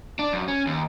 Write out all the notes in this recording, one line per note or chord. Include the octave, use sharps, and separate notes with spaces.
D4
F#2
C#4
D#2